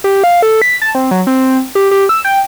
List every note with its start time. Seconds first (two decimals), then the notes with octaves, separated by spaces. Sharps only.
0.04 G4
0.24 F5
0.42 A4
0.62 B6
0.82 A5
0.95 C4
1.11 F#3
1.27 C4
1.75 G4
1.91 G4
2.09 E6
2.25 G5